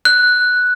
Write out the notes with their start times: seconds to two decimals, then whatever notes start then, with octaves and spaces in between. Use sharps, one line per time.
0.05 F#6